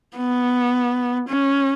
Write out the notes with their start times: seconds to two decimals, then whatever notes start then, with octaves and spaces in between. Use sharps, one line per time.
0.17 B3
1.28 C#4